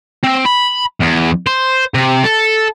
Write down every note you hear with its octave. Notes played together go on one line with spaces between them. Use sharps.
C4
B5
E2
C5
C3
A4